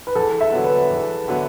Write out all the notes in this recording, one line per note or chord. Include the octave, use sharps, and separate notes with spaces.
B4
E2 A4
E5
D3 F#3 B3
B4
E2
D3 F#3 B3